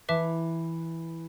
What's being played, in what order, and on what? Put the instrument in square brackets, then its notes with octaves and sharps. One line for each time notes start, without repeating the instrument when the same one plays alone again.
[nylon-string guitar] E3 [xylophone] B4 E5 A5 D6